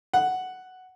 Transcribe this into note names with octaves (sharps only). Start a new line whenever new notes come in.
F#5